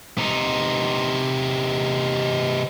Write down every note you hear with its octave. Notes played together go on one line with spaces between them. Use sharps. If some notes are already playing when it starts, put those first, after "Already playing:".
C3 D#4